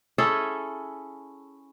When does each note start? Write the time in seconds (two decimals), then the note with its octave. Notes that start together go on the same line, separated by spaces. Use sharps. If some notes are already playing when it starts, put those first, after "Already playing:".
0.18 C#4 E4 G#4 A4